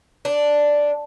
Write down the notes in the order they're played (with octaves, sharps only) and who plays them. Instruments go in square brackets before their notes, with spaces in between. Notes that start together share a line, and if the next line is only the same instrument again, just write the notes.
[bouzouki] D4